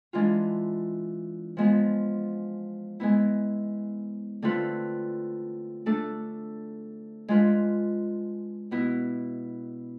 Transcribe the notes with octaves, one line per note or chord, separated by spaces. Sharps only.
E3 G#3 D4 F4
F3 G#3 B3 F4
G#3 B3 E4
D3 A3 C4 F4 B4
A3 D4 A4
G#3 D4 F4 B4
B2 B3 E4